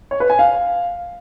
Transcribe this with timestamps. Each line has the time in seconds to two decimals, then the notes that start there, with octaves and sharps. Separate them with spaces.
0.11 C#5
0.20 B4
0.30 G#5
0.39 F5